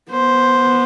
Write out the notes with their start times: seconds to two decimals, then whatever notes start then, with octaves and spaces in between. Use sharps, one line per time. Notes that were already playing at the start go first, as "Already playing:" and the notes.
0.11 B3 C5